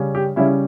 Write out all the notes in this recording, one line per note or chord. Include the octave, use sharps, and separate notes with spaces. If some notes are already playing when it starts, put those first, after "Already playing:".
Already playing: C#3 G3 C#4
G4
C#3 G3 C#4 E4